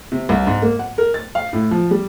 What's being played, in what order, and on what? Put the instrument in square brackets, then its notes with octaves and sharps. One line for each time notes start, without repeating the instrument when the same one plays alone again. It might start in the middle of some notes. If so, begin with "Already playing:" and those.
[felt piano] C3
C2
G#2
A#3
F#5
A#4
A6
F5
A2
F3
G3